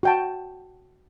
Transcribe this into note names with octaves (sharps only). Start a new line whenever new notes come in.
F#4 G5 A5